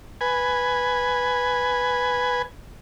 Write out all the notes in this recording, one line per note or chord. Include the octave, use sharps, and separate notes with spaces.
B4 G#5